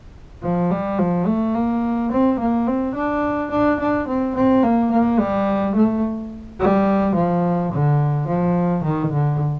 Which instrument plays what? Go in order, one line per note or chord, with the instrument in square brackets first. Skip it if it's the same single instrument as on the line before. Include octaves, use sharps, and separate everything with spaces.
[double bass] F3
G3
F3
A3
A#3
C4
A#3
C4
D4
D4
D4
C4
C4
A#3
A#3
G3
A3
G3
F3
D3
F3
D#3
D3